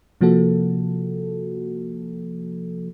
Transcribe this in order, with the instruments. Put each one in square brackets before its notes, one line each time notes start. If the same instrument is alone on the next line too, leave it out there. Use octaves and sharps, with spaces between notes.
[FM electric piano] C3 F3 A#3 F#4 A4